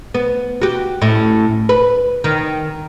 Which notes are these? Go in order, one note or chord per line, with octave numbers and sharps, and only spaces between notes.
B3
F#4 G4
A2 C#4
B4
D#3